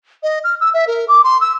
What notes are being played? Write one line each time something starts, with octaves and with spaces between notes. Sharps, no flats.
D#5
F6
E6
E5
A#4
D6
C6
E6